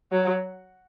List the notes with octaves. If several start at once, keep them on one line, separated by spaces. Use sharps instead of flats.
F#3